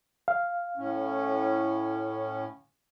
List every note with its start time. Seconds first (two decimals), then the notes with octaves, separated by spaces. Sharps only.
0.28 F5
0.77 A2 C#4